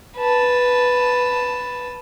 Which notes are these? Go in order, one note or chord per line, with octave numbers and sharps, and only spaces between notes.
B4 A5